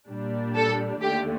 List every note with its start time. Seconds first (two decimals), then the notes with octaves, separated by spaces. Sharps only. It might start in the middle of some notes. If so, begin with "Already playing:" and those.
0.09 A#2 G3 D4
0.55 A4
1.01 D#2 D3 A3 G4